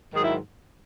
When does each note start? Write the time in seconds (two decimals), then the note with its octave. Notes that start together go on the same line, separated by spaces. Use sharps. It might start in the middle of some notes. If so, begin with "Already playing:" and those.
0.14 G#2 D#3 F#3 G#4
0.24 E4